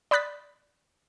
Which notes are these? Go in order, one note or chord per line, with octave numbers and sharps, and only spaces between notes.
D5 B5 D#6 F#6 A6 B6